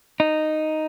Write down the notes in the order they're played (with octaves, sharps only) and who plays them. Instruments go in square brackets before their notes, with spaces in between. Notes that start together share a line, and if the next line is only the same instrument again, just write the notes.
[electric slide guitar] D#4